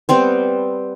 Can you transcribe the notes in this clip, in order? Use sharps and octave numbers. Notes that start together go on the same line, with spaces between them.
G3 B3 C4 C5